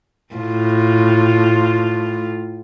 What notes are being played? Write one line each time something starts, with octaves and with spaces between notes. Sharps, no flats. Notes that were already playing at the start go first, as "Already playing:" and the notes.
A2 F4